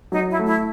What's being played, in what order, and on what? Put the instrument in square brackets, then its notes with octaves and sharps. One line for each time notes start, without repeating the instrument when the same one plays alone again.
[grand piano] F#3 [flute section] D#4
[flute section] E4
[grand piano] A3
[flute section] E4